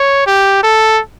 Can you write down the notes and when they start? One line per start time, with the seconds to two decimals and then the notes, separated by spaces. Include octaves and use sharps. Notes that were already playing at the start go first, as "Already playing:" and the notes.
Already playing: C#5
0.27 G4
0.63 A4